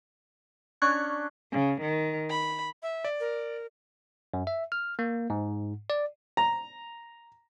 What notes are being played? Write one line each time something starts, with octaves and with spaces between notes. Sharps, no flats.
C#4 D4 C#6 F#6 G#6
C#3
D#3
B5
E5
D5
A#4
F#2
E5
F6
A#3
G#2
D5
A#5